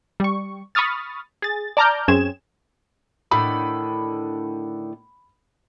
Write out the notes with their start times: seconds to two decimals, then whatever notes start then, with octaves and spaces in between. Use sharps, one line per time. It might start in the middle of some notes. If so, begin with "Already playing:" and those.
0.20 G3 C#6
0.75 B5 C#6 D#6 F6 A6
1.42 G#4 A6
1.77 D5 A5 A#5 D6 F6 G6
2.08 F#2 C4 C#4 G#4 G#6 E7
3.31 A2 D3 D#3 B5